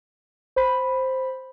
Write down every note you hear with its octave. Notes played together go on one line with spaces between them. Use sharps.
C5 B5